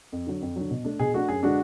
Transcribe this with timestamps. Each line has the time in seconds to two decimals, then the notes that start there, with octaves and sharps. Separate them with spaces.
0.13 F2
0.27 D3 F#3
0.42 F2
0.56 D3 F#3
0.71 B2
0.84 A3 D4
0.99 B2 G#4
1.14 A3 D4 F#4
1.28 F#2 G#4
1.43 D3 G#3 D4 F#4